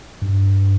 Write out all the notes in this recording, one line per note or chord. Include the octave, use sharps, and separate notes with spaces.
G2